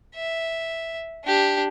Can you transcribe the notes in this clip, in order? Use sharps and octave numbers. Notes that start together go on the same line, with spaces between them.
E5
D4 G4